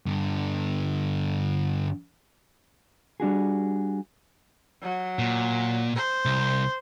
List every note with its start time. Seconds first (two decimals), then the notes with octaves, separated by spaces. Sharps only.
0.06 G2 D3
3.20 G3 D4 F#4 G#4
4.82 F#3
5.19 A#2
5.95 C5
6.25 C2